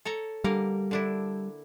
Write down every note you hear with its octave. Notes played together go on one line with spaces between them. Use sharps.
A4 C#5 A#5
D3 G3 A#3 A#4
D3 D4 E4